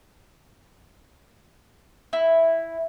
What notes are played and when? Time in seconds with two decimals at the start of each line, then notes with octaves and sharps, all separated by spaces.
2.13 E4